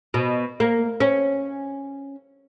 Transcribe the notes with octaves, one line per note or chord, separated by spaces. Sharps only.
B2
A#3
C#4